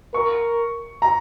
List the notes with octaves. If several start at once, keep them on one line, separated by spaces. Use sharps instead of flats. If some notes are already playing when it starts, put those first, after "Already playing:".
A#4 C#6
A#5